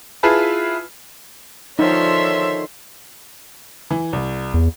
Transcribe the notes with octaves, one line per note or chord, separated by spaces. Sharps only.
E4 F4 G#4 B4 G#5 A5
D3 D#3 F3 D#4 F4 C#5 E5 C6
E3
C2
E2